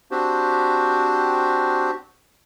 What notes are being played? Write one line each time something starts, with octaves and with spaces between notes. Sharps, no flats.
C4 D4 F#4 G4 C5